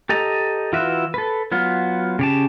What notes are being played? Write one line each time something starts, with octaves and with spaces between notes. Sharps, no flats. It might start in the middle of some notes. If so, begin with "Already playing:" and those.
G4 A4 D#5 A#5
E3 F4 F#4 B4 E5
A4 B4
F#3 B3 F4
C#3 G4 A5